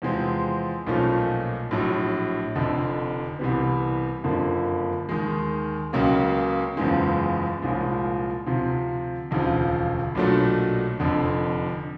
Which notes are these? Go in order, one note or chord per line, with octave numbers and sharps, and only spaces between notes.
E2 C3 F3 G#3 C4
B1 A#2 F3 A3 C#4
A#1 A2 F#3
F1 F2 D3
C2 C3 E3 G3 B3
F#1 F2 D3 F3 A#3
D#2 D#3 G#3
C#2 C#3 F#3 A#3
F#1 E2 C#3 F3 G#3
C2 A#2 F3 G#3 C#4
D2 C3 F3
E1 D2 C#3 F3
B1 A#2 F#3 A3 D4
F1 F2 D3